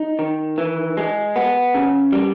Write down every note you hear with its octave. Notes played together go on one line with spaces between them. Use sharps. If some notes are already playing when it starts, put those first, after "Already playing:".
Already playing: D#4
D#3
E3
G#3
B3
C#3
G3